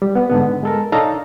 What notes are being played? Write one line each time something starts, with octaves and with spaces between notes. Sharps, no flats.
G3
B3
G#2 D3 B3
G#3 A4 A#4
D4 D#4 A4 C#5 F5 A#5